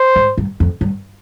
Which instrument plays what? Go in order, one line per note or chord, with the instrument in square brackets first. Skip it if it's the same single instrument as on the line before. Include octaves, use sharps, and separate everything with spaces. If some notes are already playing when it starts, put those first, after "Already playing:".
Already playing: [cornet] C5
[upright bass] G#2
G2
F2
G2